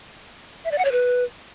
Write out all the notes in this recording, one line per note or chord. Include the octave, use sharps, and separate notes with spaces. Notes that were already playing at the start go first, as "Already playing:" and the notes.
E5
D5
F#5
C#5
B4